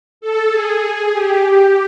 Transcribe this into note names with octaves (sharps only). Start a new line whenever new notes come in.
A4
G#4
G4